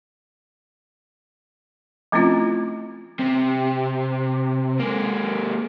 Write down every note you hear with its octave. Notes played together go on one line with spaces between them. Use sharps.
F3 A3 C4 C#4 E4 F4
C3
G#3 A#3